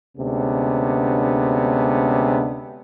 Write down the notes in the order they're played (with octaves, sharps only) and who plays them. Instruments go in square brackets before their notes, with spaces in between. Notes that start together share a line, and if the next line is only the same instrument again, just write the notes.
[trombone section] D2 C3 G#3 B3 C#4 D4